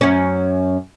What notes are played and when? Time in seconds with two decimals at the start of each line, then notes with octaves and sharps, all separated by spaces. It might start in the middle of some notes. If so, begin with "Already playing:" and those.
0.01 F#2 C#4